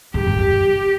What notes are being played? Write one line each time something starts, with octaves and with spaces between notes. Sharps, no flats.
G2 G4
G2
F2